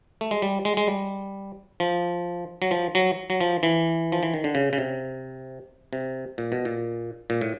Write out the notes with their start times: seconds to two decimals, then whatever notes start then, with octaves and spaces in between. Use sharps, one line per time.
0.21 A3
0.31 G#3
0.42 G3
0.65 G#3
0.77 G#3
0.87 G3
1.80 F3
2.62 F#3
2.71 F3
2.95 F#3
3.30 F#3
3.41 F3
3.63 E3
4.12 F3
4.23 E3
4.34 D#3
4.44 D3
4.55 C#3
4.73 C#3
4.78 C3
5.93 C3
6.38 A#2
6.52 B2
6.65 A#2
7.30 A#2
7.41 A2